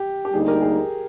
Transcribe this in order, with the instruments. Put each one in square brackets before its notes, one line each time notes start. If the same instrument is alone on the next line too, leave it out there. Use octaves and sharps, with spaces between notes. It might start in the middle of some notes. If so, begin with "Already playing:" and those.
Already playing: [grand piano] G4
G4
[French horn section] D2 D3 G3 A#3 D#4 [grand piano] G#4
[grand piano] G4 A#4
G#4